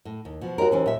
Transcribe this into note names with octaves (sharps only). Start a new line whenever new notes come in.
A2
D#2
B2 F3
D#2 F#4 A#4
E3 C#4 C5
A#2 E5